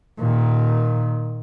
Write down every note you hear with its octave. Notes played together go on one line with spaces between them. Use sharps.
A#2 D#3